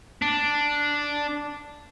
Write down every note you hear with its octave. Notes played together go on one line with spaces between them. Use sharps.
D4